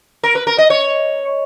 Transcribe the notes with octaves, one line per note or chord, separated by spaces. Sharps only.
A#4
B4
A#4
D#5
C#5